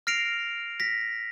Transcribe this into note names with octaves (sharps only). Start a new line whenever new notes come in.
F6 A#6 C7 D7 F7
A#6 B6